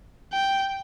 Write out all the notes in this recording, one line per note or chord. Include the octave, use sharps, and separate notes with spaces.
G5